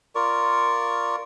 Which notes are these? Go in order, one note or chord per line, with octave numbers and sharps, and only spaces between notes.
F4 A#4 D5 C#6